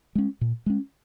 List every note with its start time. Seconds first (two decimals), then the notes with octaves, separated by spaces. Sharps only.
0.15 G#3 C#4
0.41 A#2
0.66 G#3 C#4